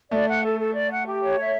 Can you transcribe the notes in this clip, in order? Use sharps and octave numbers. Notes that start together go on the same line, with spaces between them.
A3 D5
F#5
A4
A4
D5
F#5
G4
C#5
E5